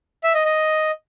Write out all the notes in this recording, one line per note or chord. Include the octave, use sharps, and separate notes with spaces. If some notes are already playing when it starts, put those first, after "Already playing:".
E5
D#5
D#5